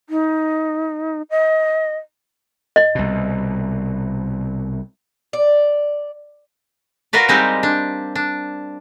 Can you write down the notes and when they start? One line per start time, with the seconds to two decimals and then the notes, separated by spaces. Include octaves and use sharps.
0.10 D#4
1.30 D#5
2.76 D#5
2.95 C2 B2
5.33 D5
7.13 F4 F#4 A#4 B4 D5
7.29 G3 G#3 C4 D#4 G4
7.63 D4
8.15 D4